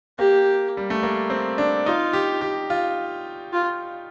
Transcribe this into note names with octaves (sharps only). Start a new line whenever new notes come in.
A#3 G4
G3
A3
A#3
C4
D4
D#4 F4
G4
G4
F4
F4